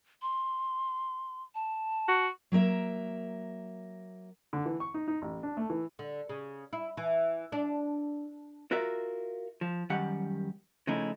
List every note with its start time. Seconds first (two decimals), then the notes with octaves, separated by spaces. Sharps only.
0.22 C6
1.55 A5
2.08 F#4
2.52 F#3 A#3 A#4 E5
4.53 D3
4.66 E3
4.80 C#6
4.94 D#4
5.08 D#4
5.22 A1
5.43 D4
5.57 A3
5.70 E3
5.99 D3
6.29 C#3
6.73 E4
6.97 E3
7.52 D4
8.71 F4 F#4 A#4 E5
9.61 F3
9.90 F#2 D#3 G3 G4 F#5
10.87 C#3 F3 G#3 A3 D#4 E4